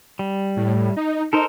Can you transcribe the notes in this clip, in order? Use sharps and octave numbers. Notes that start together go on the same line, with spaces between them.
G3
A2
D#4
D#4 A4 A#4 C5